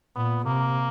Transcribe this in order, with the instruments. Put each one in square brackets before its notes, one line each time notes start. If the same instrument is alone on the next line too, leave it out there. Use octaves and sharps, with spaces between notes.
[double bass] A#2 [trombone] B3
[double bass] C3 [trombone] A#3